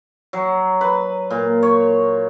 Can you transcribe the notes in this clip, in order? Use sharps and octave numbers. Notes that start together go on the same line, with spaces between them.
F#3
B4
A#2
C#5